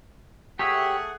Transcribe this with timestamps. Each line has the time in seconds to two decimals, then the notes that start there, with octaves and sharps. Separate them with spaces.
0.59 A3 G4 G#4 C#5 E5 F#5